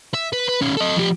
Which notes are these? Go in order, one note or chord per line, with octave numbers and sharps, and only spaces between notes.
E5
B4
B4
D#3 C#4
A4 D#5
F3 G4